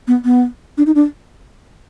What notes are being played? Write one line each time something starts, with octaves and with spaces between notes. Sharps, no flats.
B3
B3
D4
D#4
D4